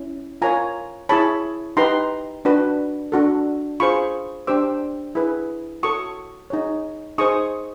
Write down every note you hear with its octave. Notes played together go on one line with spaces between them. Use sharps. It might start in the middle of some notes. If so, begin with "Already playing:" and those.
Already playing: C#4 E4
F4 A#4 C#5 G#5 A#5
E4 G#4 C#5 A5 B5
D#4 G4 B4 A#5 C6
D4 F#4 B4
D4 F#4 A4
F4 G#4 C5 B5 C#6
D4 G4 C5 D6 E6
E4 G#4 B4
F#4 A4 C#5 C#6 D#6
D#4 G#4 C#5
D#4 G#4 C5 C#6 D#6